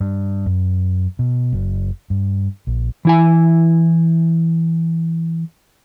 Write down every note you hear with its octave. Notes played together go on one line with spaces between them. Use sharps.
G2
F#2
B2
F#1
G2
A#1
E3 E4 G#5